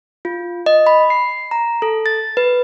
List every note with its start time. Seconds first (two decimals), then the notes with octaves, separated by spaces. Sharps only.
0.25 F4
0.66 D#5
0.87 B5
1.10 C7
1.51 A#5
1.82 A4
2.06 A6
2.37 B4